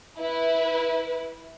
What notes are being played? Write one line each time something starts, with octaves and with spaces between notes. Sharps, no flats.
E4 B4